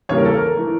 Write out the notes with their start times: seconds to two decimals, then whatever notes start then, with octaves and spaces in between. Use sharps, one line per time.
0.09 E2 C#3 G3 A#3 C#5
0.18 A#4
0.25 A4
0.33 A#4
0.56 E3 A3